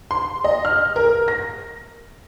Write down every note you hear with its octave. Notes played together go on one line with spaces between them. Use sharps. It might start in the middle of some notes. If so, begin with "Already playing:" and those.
C6
D#5
F6
A#4
A#6